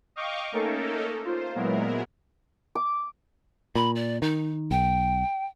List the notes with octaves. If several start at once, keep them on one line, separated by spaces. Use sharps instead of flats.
D#5 F5 G5 C#6 D6
A3 A#3 C#4 D#4 A4 A#4
F4 C5
A#2 F#3 G#3 B3 E4 A#4
D6
A#2 B5
D5
D#3 D#4
B1 G5